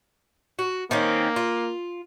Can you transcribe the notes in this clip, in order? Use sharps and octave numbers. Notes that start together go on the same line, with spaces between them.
F#4
D#3 A#3 C4 C#4
F4